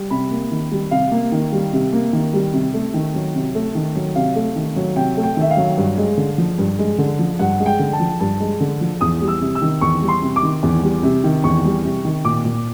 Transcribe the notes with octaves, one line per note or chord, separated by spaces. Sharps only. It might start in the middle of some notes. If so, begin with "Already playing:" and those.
Already playing: G3
C3 B5
A#3
D#3
G3
C3 F5
A#3
D#3
G3
C3
A#3
D#3
G3
C3
A3
D#3
F#3
C3
A3
D#3
F#3
C3 F5
A3
D#3
F#3
C3 G5
A3
G5
D#3 E5
F5
F#3
G2
G#3
D3
F3
G2
G#3
D3
F3
G2 F#5
G#3
G5
D3
A5
F3
G2 A5
G#3
D3
F3
E2 D#6
G3
E6
C3
E6
D#3
E2 C#6
G3
C6
C3
D6
D#3
E2
G3
C3
D#3
E2 C#6
G3
C3
D#3
A#2 D6
A#2